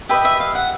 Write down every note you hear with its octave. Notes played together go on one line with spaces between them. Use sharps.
G4 B4 D#5 E5
E5
F5
F#5